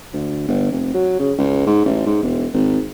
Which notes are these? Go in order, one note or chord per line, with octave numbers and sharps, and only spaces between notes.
D2
G1
F1
F#3
C#3
C#2
G#2
A1
G#2
E1
G#1